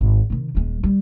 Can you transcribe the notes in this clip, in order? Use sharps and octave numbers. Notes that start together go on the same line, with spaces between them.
G#1
C3 D#3
D#1 G#3
G3